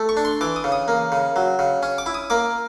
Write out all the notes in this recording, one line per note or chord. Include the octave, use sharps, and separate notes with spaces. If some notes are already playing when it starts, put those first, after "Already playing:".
Already playing: A3
C#6
D4
C6
E3 D6
D#6
C#3
D#6
A#3
C#3
F#3
C#3
C#4
D6
E4
D#6
A#3 D6